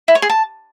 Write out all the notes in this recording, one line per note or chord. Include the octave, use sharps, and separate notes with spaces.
E4
C#5
G#4
A5